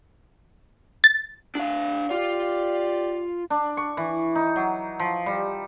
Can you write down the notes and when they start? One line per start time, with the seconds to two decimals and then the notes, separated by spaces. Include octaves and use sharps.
1.04 A6
1.55 D4 F5
2.11 F4 G4 D5
3.50 D4
3.77 C#6
3.97 E3
4.35 D#4
4.56 F#3
5.00 F3
5.26 G3